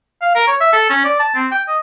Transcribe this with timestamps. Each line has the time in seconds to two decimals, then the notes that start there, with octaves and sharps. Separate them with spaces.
0.22 F5
0.35 A#4
0.48 C#5
0.60 E5
0.73 A4
0.90 C#4
1.04 D5
1.20 A5
1.35 C4
1.51 G5
1.68 D#5